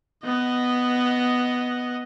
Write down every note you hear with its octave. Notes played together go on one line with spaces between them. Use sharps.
B3 D#5